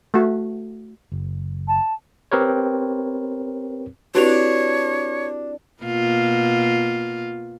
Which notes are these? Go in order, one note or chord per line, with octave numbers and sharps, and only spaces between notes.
A3 F#4
F#1
A5
C4 G4 A#4 B4 C#5
C4 D4 E4 F#4 G4 B4 C#5 F7
B2 A#3 F4